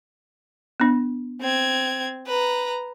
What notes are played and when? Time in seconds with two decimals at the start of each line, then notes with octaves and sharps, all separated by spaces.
0.80 B3 D4
1.41 C4 G#6
2.27 B4 A#5